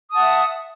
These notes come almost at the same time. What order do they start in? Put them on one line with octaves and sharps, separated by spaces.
D#6 A5 F#5 E5